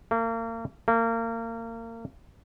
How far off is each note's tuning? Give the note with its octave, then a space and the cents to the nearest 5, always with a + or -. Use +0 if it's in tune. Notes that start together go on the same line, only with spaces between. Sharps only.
A#3 -35
A#3 -30